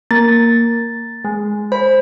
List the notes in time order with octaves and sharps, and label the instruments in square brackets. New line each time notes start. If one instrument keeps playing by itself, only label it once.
[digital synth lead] A#3 [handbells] A6
[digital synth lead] G#3
[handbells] C5 [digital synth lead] B5